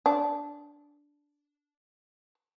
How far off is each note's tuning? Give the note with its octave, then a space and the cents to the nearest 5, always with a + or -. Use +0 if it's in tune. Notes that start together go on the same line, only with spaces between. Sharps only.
D4 -10